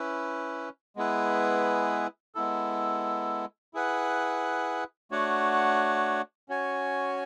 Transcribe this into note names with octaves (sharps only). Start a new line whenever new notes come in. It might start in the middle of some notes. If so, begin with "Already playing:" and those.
Already playing: C#4 E4 B4
G#3 B3 E4 G#4 B4
G#3 B3 E4 A4
E4 G#4 B4 F#5
A3 D4 F#4 C#5 F#5
C#4 F#4 C#5 G#5